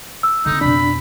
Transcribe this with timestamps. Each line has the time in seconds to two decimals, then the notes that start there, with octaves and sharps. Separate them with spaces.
0.23 E6
0.46 D3 C4 D#4
0.61 F2 B2 D4 B5